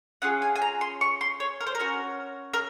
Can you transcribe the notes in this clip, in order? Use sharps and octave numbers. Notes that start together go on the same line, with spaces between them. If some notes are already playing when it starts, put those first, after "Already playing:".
C#4 F4 G#4 F#5
G#5
G#5
A#5
C6
C#6
C6
C#5
A#4
C5
A#4
C#4 F#4
A#4